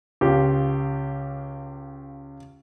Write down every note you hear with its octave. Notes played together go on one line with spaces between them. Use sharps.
C#2 F4 G4